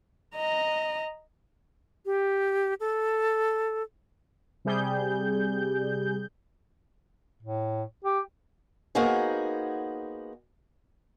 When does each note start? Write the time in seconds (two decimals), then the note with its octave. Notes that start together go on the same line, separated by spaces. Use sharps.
0.35 D#5 A#5
2.06 G4
2.80 A4
4.65 C3 G3 G#4 G6
7.43 A2
8.05 G4
8.95 A#3 B3 D#4 F#4 G#4 C5